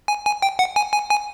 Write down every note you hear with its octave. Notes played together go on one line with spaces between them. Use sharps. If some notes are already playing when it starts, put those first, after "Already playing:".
G#5
G#5
G5
F#5
G#5
G#5
G#5